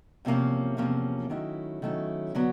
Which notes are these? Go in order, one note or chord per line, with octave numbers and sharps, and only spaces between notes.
E2 C3 F3 A#3 C#4
E2 C3 F3 A#3 C#4
D#3 F#3 A3 C#4 E4
D#3 F#3 A3 C#4 E4
D3 F#3 B3